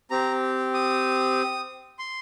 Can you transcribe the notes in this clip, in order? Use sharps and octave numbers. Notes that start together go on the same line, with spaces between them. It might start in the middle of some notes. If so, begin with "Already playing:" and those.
C4 G4 A#5
D#6
C6